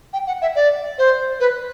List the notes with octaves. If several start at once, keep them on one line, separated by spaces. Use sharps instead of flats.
G5
F#5
E5
D5
C5
B4